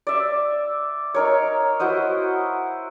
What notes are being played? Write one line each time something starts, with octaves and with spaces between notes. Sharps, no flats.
D5 E5
D#4 A#4 C#5
E4 F#4 C5 D#5